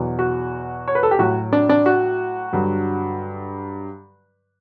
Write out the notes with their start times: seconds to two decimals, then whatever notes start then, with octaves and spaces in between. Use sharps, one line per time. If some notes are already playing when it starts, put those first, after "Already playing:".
Already playing: E2 B2 F#3
0.19 F#4
0.88 C#5
0.95 B4
1.03 A4
1.11 G4
1.19 A2 F#3 F#4
1.53 D4
1.69 D4
1.86 F#4
2.53 G2 D3 F#3